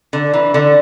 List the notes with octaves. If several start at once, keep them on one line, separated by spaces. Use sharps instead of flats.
D3
E3
D3